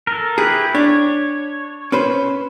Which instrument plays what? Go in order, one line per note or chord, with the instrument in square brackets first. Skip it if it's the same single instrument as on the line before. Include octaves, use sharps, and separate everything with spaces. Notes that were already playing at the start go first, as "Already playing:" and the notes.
[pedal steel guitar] A4 A#4
[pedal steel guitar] E4 G4 B4 [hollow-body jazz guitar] G#4
[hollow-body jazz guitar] D4 [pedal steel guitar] C#5
[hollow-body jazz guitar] C#4 B4 C5